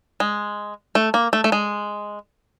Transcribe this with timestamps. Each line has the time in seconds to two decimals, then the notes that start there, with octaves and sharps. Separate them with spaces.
0.20 G#3
0.95 A3
1.14 A#3
1.33 A3
1.44 A3
1.52 G#3